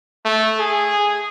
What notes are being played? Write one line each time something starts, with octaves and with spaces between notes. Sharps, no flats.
A3
G#4